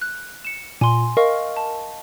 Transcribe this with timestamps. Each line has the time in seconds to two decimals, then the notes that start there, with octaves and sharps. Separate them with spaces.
0.01 F#6
0.44 C#7 E7
0.81 A#2 G#5 C6
1.17 A#4 D#5 F5 C#6
1.57 A5